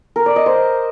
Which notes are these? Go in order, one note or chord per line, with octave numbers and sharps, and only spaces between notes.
A#4
D5
D#5
C5